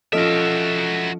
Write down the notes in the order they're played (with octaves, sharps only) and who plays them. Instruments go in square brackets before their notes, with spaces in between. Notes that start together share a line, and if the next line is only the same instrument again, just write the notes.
[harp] F3 C#4 F4 [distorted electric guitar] F#4 E5 [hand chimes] A4 D#5 D7